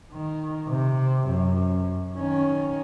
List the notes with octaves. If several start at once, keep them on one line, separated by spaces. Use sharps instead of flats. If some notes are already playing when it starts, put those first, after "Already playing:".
D#3
C3
F#2
D#3 C#4